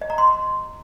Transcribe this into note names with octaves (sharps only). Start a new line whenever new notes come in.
D#5
A#5
C6